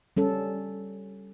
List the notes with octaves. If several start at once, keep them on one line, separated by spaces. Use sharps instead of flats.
G3 C#4 A4